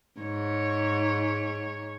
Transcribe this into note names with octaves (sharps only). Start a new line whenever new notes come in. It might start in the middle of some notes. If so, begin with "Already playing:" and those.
G#2 C#5